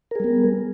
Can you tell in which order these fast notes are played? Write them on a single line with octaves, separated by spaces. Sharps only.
A#4 G#4 G3 B3